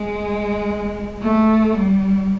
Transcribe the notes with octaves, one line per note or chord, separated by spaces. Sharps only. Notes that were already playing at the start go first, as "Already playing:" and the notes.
Already playing: G#3
A3
G3